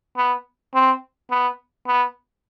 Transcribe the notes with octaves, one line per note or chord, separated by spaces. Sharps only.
B3
C4
B3
B3